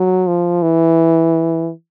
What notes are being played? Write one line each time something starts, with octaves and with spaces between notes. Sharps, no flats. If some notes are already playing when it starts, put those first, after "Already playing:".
Already playing: F#3
F3
E3